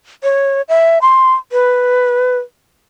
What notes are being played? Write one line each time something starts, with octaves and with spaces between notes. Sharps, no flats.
C#5
E5
C6
B4